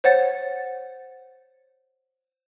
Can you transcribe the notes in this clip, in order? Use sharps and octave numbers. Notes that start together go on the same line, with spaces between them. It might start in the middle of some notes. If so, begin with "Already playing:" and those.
C5 C#5 F#5 A6